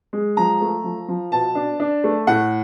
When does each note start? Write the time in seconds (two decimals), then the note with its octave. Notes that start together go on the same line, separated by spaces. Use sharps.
0.13 G#3
0.37 F3 A#5
0.61 A3
0.84 F3
1.08 F3
1.32 B2 A5
1.55 D4
1.80 D4
2.04 A3
2.27 A2 F#5